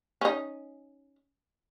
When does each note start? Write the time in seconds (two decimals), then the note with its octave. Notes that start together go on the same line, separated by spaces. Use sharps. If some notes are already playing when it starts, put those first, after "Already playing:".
0.21 C#4 D#4